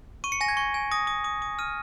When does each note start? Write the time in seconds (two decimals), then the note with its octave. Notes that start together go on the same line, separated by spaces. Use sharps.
0.24 C#6 D#7
0.32 C#7
0.41 G#5 A#6
0.48 G#6
0.57 C#6
0.74 G#5
0.91 D#6 A#6
1.07 D#6
1.24 D#6
1.42 D#6
1.59 F6 D#7